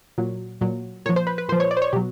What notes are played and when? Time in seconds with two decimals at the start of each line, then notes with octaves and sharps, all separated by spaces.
0.18 A#2 F#3
0.61 A#2 F#3
1.06 A#2 C#5
1.09 F3
1.16 C5
1.27 B4
1.38 B4
1.49 A#2 C5
1.52 F3
1.60 C#5
1.71 D5
1.77 C5
1.82 C#5
1.93 B2 F#3 G4